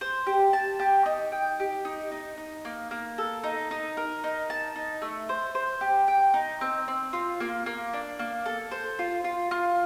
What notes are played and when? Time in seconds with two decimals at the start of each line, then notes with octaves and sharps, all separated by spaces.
0.01 C5
0.27 G4
0.53 A5
0.80 G4
1.06 D#4
1.32 G5
1.60 G4
1.85 D#4
2.12 D#4
2.38 D#4
2.65 A#3
2.91 A#3
3.18 A4
3.44 D#4
3.71 D#4
3.97 A#4
4.24 D#4
4.50 A5
4.76 D#4
5.02 A3
5.29 C5
5.55 C5
5.81 G4
6.08 G5
6.34 D#4
6.61 C4
6.88 C4
7.13 F4
7.40 A#3
7.66 A#3
7.93 D4
8.19 A#3
8.46 A4
8.71 C5
8.99 F4
9.24 F4
9.51 F4